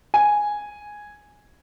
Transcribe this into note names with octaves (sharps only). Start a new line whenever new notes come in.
G#5